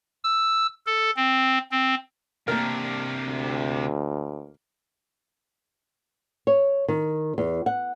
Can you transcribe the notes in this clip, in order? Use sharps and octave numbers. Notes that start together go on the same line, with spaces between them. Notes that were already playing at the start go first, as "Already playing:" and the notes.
E6
A4
C4
C4
C3 A#3 D4 A#4
D2
C#5
D#3
E2
F#5